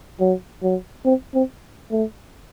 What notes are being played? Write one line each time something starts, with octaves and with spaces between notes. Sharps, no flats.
F#3
F#3
C4
C4
A3